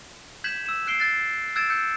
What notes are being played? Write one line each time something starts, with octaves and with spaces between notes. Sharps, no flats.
G6 G#6 B6 E7 F#7
E6 E7
F#6 C7 D7 G7
F#6 A6 C7
E6 F#6 G#6 A6 D7 E7
E6 G6 C#7